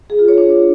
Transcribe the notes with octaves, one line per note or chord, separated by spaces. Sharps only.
G#4
F4
C#5
D4